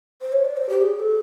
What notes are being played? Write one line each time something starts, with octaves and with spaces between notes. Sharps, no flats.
C5
C#5
D5
C5
G4
G#4
A4